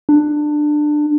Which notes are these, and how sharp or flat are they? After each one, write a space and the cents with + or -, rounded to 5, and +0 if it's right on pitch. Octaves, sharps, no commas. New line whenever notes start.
D4 +20